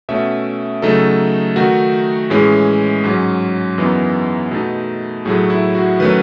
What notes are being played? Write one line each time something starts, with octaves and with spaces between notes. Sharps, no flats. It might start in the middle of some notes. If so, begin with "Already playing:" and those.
B2 A3 C#4 E5
C#3 F#3 A3 D#4 A4
D#3 A3 D#4 F#4
A2 E3 G#3 C#4 G#4
G#2 F#3 C#4
F#2 E3 B3 D#4
B2 A3 D#4
A2 F#3 A3 G#4
E4
F#4
D#3 F#3 A3 C#4 B4